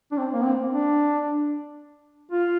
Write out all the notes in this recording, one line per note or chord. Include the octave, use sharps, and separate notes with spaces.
D4
C4
A#3
C4
D4
F4